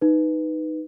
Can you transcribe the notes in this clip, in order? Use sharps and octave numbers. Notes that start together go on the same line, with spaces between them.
D#4 B4